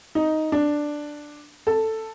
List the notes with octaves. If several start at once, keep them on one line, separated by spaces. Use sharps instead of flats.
D#4
D4
A4